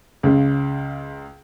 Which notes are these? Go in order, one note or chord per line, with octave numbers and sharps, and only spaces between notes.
C#2 C#3